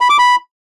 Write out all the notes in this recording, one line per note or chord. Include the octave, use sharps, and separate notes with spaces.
B5
D6
B5